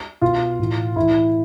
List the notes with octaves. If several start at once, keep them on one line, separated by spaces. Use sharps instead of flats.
B2 F4
A2 E3
A2 E3 E4